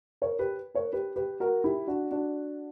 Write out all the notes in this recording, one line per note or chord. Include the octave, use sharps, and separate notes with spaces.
A#4 C#5
G4 B4
A#4 C#5
G4 B4
G4 B4
F#4 A#4
E4 G4
D4 F#4
D4 F#4